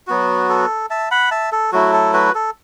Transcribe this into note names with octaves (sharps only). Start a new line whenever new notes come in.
F#3 B3 F#4
A4
E5 A5
F#5 B5
E5 A5
A4
F#3 A3 E4 F#4
A4
F#4 B4
A4